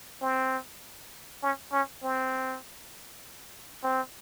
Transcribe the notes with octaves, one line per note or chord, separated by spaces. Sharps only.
C4
C#4
C#4
C4
C4